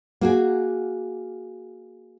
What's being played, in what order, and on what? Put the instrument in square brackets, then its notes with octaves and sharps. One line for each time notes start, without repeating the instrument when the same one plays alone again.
[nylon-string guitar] A#3 F#4 G#4